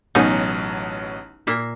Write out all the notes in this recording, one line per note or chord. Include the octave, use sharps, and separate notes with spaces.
A1 B2 F#3 B3 C#4 D#4
A#2 A#3 E5